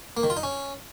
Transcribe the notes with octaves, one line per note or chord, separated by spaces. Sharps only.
A#3
D#3
F4
D#4
C#4